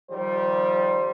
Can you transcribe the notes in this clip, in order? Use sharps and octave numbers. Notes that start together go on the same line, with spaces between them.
D#3 F3 G3 C5